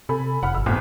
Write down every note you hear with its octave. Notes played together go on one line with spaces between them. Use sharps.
C3 A4 G#5 B5
F1 F#5 B5 F6
G#1 E6
G#1 E2 A2